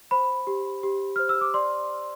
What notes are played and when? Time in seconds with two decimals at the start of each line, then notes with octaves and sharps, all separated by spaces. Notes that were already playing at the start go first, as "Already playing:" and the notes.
0.11 C5 B5
0.47 G4
0.83 G4
1.16 C5 F6
1.29 E6
1.41 D6
1.54 D5 C6